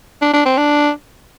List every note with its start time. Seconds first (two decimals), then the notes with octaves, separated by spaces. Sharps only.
0.22 D4
0.34 D4
0.45 C4
0.57 D4